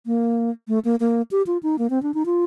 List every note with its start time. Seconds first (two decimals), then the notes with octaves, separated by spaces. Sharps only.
0.06 A#3
0.68 A3
0.85 A#3
1.00 A#3
1.31 G4
1.47 F4
1.63 D#4
1.78 A#3
1.90 C4
2.03 D4
2.14 D#4
2.26 F4